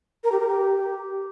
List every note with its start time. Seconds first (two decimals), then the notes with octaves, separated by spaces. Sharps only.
0.24 A#4
0.32 G4
0.40 A#4
0.48 G4